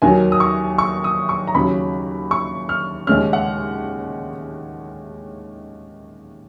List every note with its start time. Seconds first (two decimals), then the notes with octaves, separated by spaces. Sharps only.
0.02 D#2 D#3 F#3 G#5
0.32 D#6
0.40 C#6
0.78 C#6
1.04 D#6
1.29 C#6
1.47 A#5
1.55 D#2 C#3 F#3 C#4 B5
2.31 C#6
2.69 F6
3.07 D#2 C#3 G#3 C#4 F6
3.33 F#5